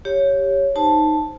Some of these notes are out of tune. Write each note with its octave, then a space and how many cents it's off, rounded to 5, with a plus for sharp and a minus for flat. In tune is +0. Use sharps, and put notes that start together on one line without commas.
G4 +0 C#5 +0
D#4 +0 C5 +0 A5 +0